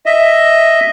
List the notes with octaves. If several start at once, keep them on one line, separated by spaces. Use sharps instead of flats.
D#5 E5